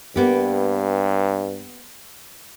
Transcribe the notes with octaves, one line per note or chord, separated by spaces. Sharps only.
G2 A#3 B3 G4